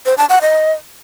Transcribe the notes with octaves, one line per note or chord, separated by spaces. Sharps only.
C5
A5
F#5
D#5